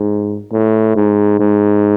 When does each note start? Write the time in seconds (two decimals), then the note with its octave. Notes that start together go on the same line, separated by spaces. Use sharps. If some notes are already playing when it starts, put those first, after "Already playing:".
Already playing: G#2
0.52 A2
0.96 G#2
1.40 G#2